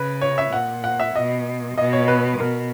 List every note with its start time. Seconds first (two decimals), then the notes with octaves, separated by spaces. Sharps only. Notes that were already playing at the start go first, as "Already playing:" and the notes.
Already playing: C#3 B4
0.22 C#5
0.38 E5
0.52 A#2 F#5
0.84 F#5
1.00 E5
1.15 B2 D#5
1.77 B2 D#5
1.93 C#5
2.08 B4
2.40 B2 A#4